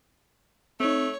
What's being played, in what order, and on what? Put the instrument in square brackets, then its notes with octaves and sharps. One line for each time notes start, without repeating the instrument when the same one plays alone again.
[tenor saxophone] A3 [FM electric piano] C4 D#4 [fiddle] C#5